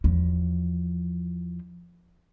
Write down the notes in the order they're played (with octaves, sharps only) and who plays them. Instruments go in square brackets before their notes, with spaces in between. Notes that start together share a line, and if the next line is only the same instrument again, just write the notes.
[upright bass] E2 F3